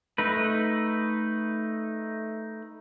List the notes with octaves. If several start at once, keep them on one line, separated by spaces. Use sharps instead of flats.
A3 D#4 B4